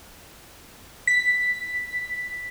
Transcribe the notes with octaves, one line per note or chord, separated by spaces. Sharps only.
B6